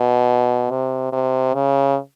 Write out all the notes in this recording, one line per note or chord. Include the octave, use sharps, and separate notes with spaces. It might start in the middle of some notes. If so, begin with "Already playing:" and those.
Already playing: B2
C3
C3
C#3